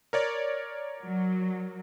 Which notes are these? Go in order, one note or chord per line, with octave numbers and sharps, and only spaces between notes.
A#4 C#5 D5
F#3